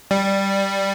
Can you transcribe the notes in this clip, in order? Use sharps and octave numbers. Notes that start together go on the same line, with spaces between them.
G3